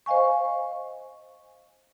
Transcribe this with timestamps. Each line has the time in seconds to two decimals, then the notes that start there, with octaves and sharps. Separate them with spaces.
0.06 C5 D#5 F5 G#5 C#6